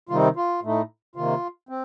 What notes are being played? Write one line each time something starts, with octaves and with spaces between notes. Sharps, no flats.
C3 D#3 G3 C4 D#4 F4
F4
A2 A3 D#4
C3 D#3 A#3 F4
C4